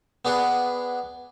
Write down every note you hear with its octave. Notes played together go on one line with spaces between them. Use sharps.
B3 D4 G#4 B4 F#5